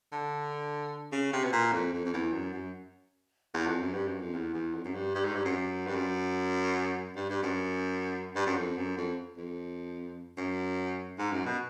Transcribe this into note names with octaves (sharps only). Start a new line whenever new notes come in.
D3
C#3
C3
B2
A#2
F2
F2
F2
E2
F#2
F#2
E2
F2
F#2
G2
F#2
F2
E2
E2
F2
F#2
G2
G2
G#2
G2
F#2
G2
F#2
G2
G2
F#2
G2
F#2
F2
F#2
F2
F2
F#2
G#2
F#2
B2